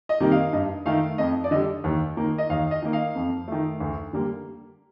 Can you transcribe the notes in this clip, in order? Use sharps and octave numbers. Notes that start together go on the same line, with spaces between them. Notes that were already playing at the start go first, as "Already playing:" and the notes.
D#5
C3 D#3 G3 A#3
F5
G2 D#5
D#3 A3 F5
F2 D#5
D5
D3 G3 D#5
D#2
D#3 A#3
D#5
D#2 F5
D#5
D#3 A#3
F5
F2
D#3 A3
D2
D3 G3 A#3